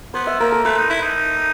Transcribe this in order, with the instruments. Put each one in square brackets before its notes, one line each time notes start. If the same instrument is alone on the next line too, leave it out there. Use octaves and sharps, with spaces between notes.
[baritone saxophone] B3 [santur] C5
[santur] E5
[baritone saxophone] A#3 [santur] A#4
[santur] A4
[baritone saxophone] A3 [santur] B4
[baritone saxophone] D#4
E4
D#4